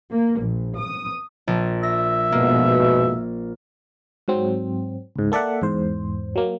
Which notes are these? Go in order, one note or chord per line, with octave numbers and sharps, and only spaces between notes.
A#3
A#1
D#6
A#1
E5 A#6
F2 G#2 B2 A#3
G#2 F#3 C4
C#2 G#2
A#3 A4 D5 E5 F#5
E2 G#2 C5
F#3 A#3